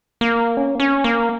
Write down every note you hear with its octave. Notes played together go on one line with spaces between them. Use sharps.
A#3
C#4
A#3
C#4
A#3